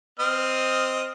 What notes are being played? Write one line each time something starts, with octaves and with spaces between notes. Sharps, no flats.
C4 D#5 F6